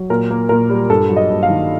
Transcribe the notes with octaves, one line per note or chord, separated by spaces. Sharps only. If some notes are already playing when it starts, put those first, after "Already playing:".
Already playing: F#3
A#2 A#4
A#3
A#2 A#4
G3
G2 A4
F#3
D#5
G2
F5
D#3